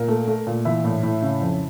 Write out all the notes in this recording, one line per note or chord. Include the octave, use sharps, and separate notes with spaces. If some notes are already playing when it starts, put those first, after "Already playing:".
Already playing: A#2 A#4
A3
A3
A#2
E3 E4 E5
A2
A2
C#3
F2